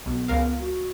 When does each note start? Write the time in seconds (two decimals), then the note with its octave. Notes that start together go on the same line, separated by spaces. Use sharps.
0.06 B1 B3
0.28 C#2 A#4 F5
0.60 F#4